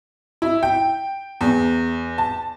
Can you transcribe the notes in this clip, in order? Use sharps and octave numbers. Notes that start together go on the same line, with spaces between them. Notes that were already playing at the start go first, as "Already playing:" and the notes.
E4
G5
E2
A5